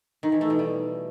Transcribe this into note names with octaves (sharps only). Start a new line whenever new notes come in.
D#3
E3
A3
B2
G3